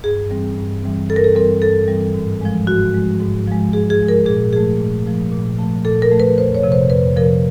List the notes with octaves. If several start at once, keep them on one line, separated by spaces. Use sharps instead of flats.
G2 G#4
E3 G3 C4
G2
E3 G3 C4
G2 A4
A#4
A4
E3 G3 C4 A#4
G2 A4
E3 G3 C4
G#2
F3 G#3
G#2 F#4
F3 G#3
G#2
F3 G#3
G#2 G#4
G#4
F3 G#3
A#4
A#2 G#4
F3 A3 G#4
A#2
F3 A3
A#2
F3 A3
A#2 A4
A#4
F3 A3
B4
F2 C5
C#5
C3 F3
C5
F2 B4
C3 F3 A#4